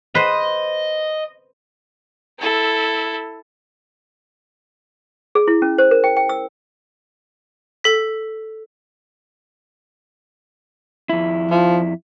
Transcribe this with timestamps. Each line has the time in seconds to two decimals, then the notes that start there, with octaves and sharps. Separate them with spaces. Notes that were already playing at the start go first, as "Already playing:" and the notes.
0.15 B4 C5 D#5
2.39 E4 A4
5.35 G#4
5.48 E4
5.62 C#4
5.78 C5
5.91 A#4
6.04 G5
6.17 G5
6.29 E6
7.84 A4 B6
11.09 F2 E4
11.51 F3